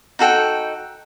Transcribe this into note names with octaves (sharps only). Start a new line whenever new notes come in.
D#4 F#4 A4 G5